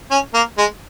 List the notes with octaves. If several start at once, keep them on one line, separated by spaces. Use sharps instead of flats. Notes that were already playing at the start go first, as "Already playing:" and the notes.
C#4
A#3
G#3